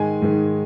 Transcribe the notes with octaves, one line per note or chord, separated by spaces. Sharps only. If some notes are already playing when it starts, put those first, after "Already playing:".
Already playing: G#2 D#3 G#3 G#5
G#2 D#3 G#3